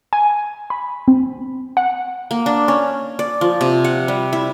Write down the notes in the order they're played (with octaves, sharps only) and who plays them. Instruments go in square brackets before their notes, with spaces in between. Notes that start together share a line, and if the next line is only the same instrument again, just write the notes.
[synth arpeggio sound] G#5
B5
C4
F#5
[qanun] A#3
D4
C#4
D5
F3
C3
F#5
G3
E4